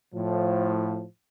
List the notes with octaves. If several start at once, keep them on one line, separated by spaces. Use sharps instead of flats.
A2 F3